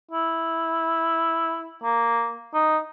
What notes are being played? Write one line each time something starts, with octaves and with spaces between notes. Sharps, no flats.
E4
A#3
D#4